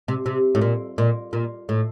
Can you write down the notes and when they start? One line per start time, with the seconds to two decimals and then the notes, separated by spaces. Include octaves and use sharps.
0.08 C3
0.26 C3
0.55 A2
0.61 A#2
0.98 A#2
1.33 A#2
1.69 A2